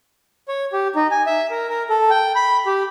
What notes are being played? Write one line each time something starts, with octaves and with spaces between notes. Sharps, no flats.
C#5
G4
D#4
G#5
E5
A#4
A#4
A4
G5
B5
G4